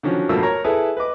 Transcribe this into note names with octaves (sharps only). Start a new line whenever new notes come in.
D3 D#3 F3 F#3 C#4
G2 B2 F3 A3 A#3 E6
A#4 C#5 A#5
E4 G#4 A4 B4
B4 D#5 D6